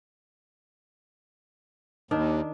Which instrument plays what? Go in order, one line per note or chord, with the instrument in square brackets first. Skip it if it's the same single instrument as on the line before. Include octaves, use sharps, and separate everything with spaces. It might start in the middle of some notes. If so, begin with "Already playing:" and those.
[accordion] D#2 [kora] D#3 D4